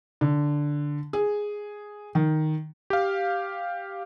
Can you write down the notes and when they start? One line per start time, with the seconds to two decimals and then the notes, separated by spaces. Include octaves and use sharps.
0.21 D3
1.13 G#4
2.15 D#3
2.90 G4 F5